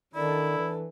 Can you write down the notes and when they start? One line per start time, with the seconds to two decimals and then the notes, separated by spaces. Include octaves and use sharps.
0.15 D#3 D4 E4 A4 D5
0.58 E3